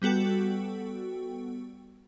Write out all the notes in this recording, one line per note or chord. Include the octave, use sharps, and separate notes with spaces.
G3 B3 F#4 A4 G5